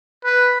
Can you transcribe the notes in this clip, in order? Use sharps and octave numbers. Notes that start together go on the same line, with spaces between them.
B4